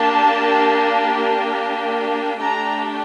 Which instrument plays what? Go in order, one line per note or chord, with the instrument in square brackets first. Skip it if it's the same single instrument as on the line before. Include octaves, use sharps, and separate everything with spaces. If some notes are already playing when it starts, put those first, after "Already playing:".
Already playing: [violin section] A#3 D4 G4 A5
A3 D4 G4 A#5